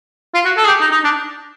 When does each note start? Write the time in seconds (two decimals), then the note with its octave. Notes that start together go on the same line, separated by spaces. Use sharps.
0.34 F4
0.45 F#4
0.57 A4
0.65 G#4
0.68 G4
0.81 D#4
0.91 D#4
1.04 D4